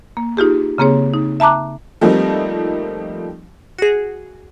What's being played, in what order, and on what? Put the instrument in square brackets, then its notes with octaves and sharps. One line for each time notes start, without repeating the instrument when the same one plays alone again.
[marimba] A#3
D#4 F4 G4 G#4
C#3 A#3 C4 G#4 C#5
D#4
E5 A5 A#5 D6 F#6
[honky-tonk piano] F3 G3 A3 A#3 C4 D#4
[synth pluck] F#4 G#4